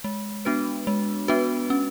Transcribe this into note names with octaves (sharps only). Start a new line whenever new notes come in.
G#3
B3 D4 F#4 B4
G#3
B3 D4 F#4 B4
C#4